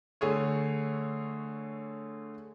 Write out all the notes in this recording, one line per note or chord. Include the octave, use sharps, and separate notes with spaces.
D3 A3 G#4 C#5